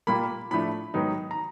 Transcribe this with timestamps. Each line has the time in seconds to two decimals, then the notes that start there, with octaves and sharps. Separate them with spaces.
0.07 A#2 G3 A#3 B5
0.51 A2 F3 A3 D4 B5
0.94 G#2 D#3 F#3 B3 D#4
1.31 A#5